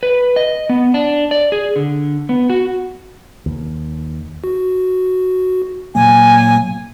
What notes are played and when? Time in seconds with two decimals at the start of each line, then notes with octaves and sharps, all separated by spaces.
0.03 B4
0.36 D#5
0.69 B3
0.94 D4
1.31 D5
1.52 G#4
1.76 D3
2.29 B3
2.50 F#4
3.46 D#2
4.44 F#4
5.95 A#2 F#3 A#3 G#5